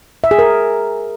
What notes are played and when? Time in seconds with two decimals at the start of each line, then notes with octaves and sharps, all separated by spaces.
0.24 E5
0.31 G#4
0.39 A#4